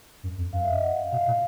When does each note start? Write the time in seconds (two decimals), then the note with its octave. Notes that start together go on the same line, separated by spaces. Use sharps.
0.23 F#2
0.38 F2
0.53 F#2 F5
0.63 E5
0.73 D#5
0.83 F#5
0.97 F5
1.12 B2 F5
1.27 A#2 F5